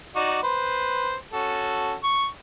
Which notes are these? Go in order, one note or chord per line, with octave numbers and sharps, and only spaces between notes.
D#4 F#4 D5
B4 C5
C#4 F#4 A4
C#6